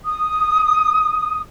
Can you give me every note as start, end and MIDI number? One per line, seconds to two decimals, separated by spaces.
0.05 1.40 87